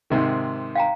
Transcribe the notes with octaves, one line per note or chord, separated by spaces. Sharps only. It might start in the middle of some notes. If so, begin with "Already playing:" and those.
G#2 C3 D#3
F5 G5 A#5